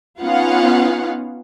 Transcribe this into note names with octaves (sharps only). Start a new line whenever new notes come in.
B3 C#4 D#4 F4 F5 F#5